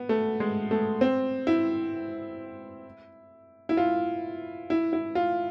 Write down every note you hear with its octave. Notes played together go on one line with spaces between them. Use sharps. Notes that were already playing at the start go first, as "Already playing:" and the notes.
Already playing: B3
A3
G#3
A3
C4
E4
E4
F4
E4
E4
F4